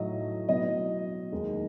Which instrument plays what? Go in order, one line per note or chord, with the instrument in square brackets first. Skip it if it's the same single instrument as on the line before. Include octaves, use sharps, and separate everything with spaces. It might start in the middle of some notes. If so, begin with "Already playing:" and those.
Already playing: [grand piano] A2 F#3 A3 D#4 D#5
B2 F#3 B3 E4 D#5
D#2 D#3 G#3 D#4